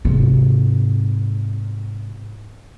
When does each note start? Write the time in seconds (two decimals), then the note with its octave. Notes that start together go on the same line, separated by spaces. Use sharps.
0.05 G#2 C3